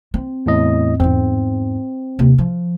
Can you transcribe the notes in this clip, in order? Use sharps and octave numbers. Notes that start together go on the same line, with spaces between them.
C4
E2 A2 D#5
E2 G#2 C4
D#2 C3
F3